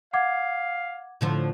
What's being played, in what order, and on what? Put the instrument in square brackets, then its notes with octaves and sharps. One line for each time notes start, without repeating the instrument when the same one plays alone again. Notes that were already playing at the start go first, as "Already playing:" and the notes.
[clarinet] F5 [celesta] F#5 D6 G#6
[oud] A2 D3 F3